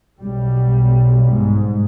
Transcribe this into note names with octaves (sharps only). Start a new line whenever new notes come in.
B1 G3
G#2